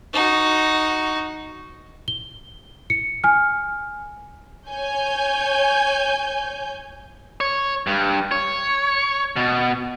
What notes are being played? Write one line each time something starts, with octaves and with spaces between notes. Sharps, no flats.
D#4 F#4
G7
C#7
G#5 F6
C#5 G#5 G6
C#5
G2
C#5
B2